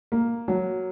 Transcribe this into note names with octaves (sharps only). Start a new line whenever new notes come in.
A#3
F#3